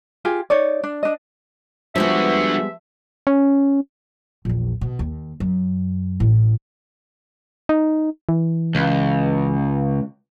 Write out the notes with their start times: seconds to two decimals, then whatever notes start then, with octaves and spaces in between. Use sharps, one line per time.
0.25 F4 G4 G#4
0.50 D#4 C#5 D5
0.84 D4
1.03 D4 D#5
1.96 D3 F3 G3 G#3 B3 F#4 E5
3.27 C#4
4.45 A#1 E2
4.81 B2
4.99 D#2
5.40 F#2
6.20 A1 A2
7.69 D#4
8.29 E3
8.75 C#2